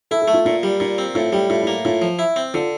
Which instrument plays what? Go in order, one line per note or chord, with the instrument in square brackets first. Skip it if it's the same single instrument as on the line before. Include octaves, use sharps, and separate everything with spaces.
[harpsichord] E4 [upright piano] A4
[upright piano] A4
[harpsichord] A3
[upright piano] F4
[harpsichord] A#2 [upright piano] F4
[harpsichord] G3
[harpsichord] A#2 [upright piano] F4
[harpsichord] C4
[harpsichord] A2 [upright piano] F4
[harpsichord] G3 [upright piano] G4
[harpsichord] A2 [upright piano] F4
[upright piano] E4
[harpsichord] A#3
[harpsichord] A2 [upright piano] F4
[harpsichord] F3
E4
C4
[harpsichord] D3 [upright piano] F4